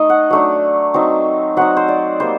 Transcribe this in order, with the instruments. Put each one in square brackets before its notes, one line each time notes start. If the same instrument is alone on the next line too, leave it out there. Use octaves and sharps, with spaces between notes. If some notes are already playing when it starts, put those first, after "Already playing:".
Already playing: [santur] A3 D#4 D#5
F#5
F#3 A3 D4
F#3 C4 D#4
F#3 C4 D#4 F#5
C5
D5
G3 A#3 C5